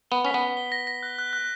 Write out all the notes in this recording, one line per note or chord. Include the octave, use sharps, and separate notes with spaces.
B3 G7
C#4 B6
B3
G7
G7
A#6
A#6
F#6
F#6
F#6